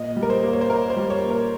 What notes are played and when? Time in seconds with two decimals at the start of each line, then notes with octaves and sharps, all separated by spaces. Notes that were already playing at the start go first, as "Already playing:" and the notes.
Already playing: A#2 D#5
0.16 G3
0.23 A#4
0.30 C5
0.43 A#3
0.53 C#5
0.61 C5
0.69 A#3 A#4
0.90 C5
0.97 G3
1.10 C#5
1.23 A#2
1.30 A#4